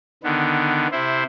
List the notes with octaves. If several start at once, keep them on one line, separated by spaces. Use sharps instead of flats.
D3 D#3 B3
C3 E4 C5